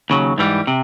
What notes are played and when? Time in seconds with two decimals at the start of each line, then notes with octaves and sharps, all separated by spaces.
0.10 D#2 C#3 F#3
0.38 G#2 E3 G3
0.67 C3